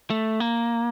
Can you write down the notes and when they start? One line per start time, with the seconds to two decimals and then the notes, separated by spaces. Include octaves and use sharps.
0.10 A3
0.40 A#3